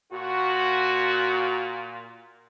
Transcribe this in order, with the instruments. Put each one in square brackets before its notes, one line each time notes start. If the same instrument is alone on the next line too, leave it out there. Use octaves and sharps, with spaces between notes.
[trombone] A#2 [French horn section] F#4